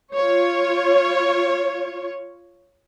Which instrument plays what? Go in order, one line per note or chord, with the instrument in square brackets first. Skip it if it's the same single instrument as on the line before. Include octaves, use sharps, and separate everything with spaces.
[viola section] F4 C#5